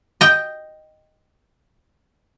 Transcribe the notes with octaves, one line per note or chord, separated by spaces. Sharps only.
D#5 G5